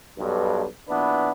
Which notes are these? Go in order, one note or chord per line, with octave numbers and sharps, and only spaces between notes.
B1 G2
A#1 B3 D4 E4 B4